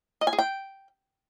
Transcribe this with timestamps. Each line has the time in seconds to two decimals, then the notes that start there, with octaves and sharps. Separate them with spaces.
0.21 D#5
0.27 G#5
0.33 G#4
0.38 G5